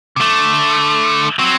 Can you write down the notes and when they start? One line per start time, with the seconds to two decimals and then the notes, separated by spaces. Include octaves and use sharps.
0.16 C3
0.21 D3 A3
1.39 F#3 C4